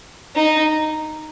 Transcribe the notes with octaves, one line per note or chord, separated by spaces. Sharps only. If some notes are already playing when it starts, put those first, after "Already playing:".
D#4